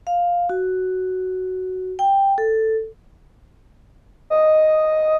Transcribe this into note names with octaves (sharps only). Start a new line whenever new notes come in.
F5
F#4
G5
A4
D#5